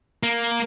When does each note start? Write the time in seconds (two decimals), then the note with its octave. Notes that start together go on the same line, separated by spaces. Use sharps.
0.23 A#3